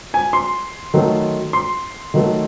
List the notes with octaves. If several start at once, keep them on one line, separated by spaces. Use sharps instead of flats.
G#5
C6
D#3 F#3 A3
C6
D#3 F#3 A3